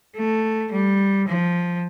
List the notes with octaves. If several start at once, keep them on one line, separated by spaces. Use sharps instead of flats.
A3
G3
F3